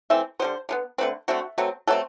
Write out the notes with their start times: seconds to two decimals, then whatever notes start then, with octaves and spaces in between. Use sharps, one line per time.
0.10 E3 A3 C4 E5
0.39 D3 G3 B3 C5
0.69 D3 G3 B3
0.98 D3 A3 C4 B4
1.28 D3 A3 C4 F#4
1.58 B2 F#3 A3 C4
1.87 B2 F#3 A3 C4 A4